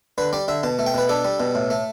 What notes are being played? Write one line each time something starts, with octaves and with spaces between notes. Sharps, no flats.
D3 B4
G3 D5
D3 E5
B2 A5
A3
G5
B2 B4
D4 A4
G3
B2
A2
A3